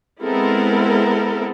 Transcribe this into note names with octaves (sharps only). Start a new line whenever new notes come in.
G#3 B3 C4 E4 A4 A#4